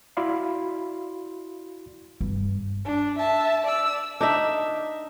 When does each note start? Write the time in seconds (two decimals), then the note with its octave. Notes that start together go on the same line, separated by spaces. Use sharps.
0.17 E4 F#4 D5 F5 B5 C6
2.21 G2
2.85 D4
3.19 E5 A5
3.65 D5 E6
4.21 D4 D#4 E5